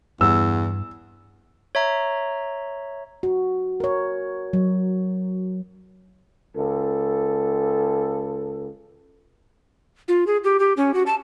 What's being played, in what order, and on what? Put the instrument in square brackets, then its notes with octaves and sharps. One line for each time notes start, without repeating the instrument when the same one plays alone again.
[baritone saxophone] E2 [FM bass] G2 [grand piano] E6
[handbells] C#5 E5 A#5
[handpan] F#4
A#4 C#5
F#3
[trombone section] C#2 A4
[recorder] F4
G#4
G4
G4
C#4
F#4
A5